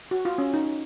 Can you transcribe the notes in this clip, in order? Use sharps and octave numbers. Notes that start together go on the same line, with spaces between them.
F#4
F4
C#4
D#4